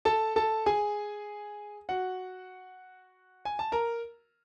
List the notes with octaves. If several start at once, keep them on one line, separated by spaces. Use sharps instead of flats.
A4 A5
A4 A5
G#4 G#5
F#4 F#5
G#5
A5
A#4 A#5